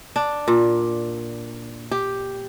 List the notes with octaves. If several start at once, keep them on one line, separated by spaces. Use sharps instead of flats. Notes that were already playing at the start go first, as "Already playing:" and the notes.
D4
A#2
G4